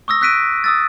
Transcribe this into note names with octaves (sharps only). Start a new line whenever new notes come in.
C#6 D#6 E6 A#6
E6 F#6 B6 D7 D#7
D#6 E6 A6